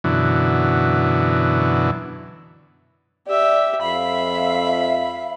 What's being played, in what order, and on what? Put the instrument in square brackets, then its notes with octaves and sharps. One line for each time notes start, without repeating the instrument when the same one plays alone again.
[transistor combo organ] F#2 B2 D3 E3
[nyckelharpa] G4 E5 [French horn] D5
[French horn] F2 [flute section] E5 F5 [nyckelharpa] B5